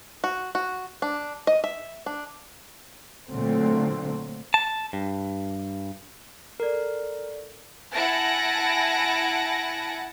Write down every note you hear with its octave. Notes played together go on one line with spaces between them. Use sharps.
F#4
F#4
D4
D#5
E5
D4
A#2 D3 F#3 A3 C4
A5
G2
A4 A#4 D5
E4 F#5 G#5 A5 A#6 D7